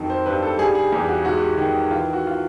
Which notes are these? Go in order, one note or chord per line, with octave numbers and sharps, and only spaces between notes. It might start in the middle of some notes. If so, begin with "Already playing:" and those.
Already playing: F2 D#3 F#3
C5
G2 B4
A4
G3 G#4
G#4
E2 G4
F#4
G#2 F#4
G4
F#4
D#3
E3 F4
F#4
F4